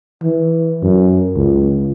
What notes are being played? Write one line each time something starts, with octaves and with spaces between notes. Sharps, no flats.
E3
F#2
C#2